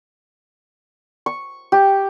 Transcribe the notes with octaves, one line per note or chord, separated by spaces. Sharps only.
C#6
G4